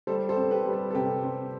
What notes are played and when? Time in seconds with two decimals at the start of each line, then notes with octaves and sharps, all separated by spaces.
0.07 G3 A4 C5
0.29 A4 C5
0.36 C4
0.51 G4 B4
0.66 G3 B4
0.73 A4
0.90 A4
0.95 C3 G4
1.23 C4